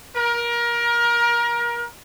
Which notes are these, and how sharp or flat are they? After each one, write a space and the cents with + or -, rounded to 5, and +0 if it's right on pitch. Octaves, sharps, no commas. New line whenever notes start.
A#4 +25